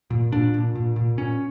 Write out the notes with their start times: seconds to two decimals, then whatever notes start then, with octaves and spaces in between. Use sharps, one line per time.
0.10 A#2
0.32 A#2 D4
0.54 A#2
0.75 A#2
0.96 A#2
1.17 A#2 C#4